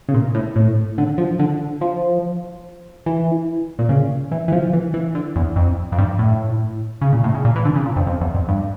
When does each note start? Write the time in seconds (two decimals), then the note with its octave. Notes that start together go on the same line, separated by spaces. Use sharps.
0.09 C#3
0.14 A#2
0.35 A2
0.56 A2
0.98 D3
1.18 F3
1.39 D3
1.81 F3
3.06 E3
3.79 A#2
3.89 C#3
4.31 E3
4.48 E3
4.52 F3
4.73 E3
4.94 E3
5.15 D3
5.36 E2
5.56 F2
5.92 F2
5.98 G2
6.19 A2
7.01 C#3
7.13 A#2
7.24 A2
7.35 C#3
7.45 A#2
7.56 E3
7.65 D3
7.76 C#3
7.86 A#2
7.96 F2
8.07 F2
8.21 E2
8.35 F2
8.49 G2